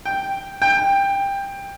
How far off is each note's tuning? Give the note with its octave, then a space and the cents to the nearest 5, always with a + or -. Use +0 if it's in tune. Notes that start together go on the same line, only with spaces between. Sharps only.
G5 +0
G5 +15